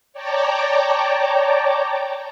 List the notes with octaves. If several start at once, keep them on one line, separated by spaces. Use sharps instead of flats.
C#5 D5 G5 A5 A#5 D6